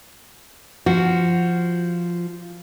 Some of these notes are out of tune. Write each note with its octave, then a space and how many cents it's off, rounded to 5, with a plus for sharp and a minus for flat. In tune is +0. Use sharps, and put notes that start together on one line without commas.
F3 -5 F#4 +0